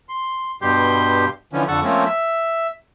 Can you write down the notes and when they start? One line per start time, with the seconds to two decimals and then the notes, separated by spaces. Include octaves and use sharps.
0.09 C6
0.62 G2 B2 G3 G4 C6 G6
1.53 D3 E3 F3 C#4
1.68 F2 D3 A4 F#5 C#6
1.84 F3 A3 A#3 C4 C#4
2.05 E5